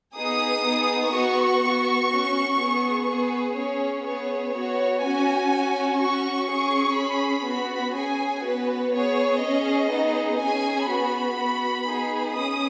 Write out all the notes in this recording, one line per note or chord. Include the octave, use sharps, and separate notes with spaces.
B3 D#4 G#4 D#6
B3 D#4 G#4
B3 F#4 C#6
B3 F#4
C#4 F#4
B3 G#4
B3 G#4 B4
C#4 G#4 C#5
B3 G#4 C#5
B3 F#4 C#5
C#4 F#4 G#5
C#4 F#4
C#4 F#4 C#6
C#4 G#4 C#6
C#4 G#4 B5
B3 F#4 B5
C#4 G#4 G#5
B3 F#4 B4
B3 G#4 C#5
C#4 G#4 D#5
B3 D#4 G#4
C#4 G#4 G#5
B3 F#4 B5
B3 F#4
B3 D#4 G#4
C#4 G#4 D#6